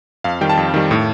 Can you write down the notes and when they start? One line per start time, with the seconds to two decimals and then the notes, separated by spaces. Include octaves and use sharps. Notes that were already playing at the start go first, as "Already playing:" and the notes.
0.24 F2 F5
0.41 D#3 G3 G5
0.50 A5
0.57 F2
0.74 D#3 G3
0.91 A2